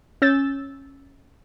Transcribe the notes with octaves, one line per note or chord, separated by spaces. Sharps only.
C#4 E6 G6 A6